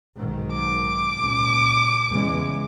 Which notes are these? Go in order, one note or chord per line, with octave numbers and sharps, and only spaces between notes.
B1 G#2 D#3
D6
C#2 A#2
E2 C#3 G#3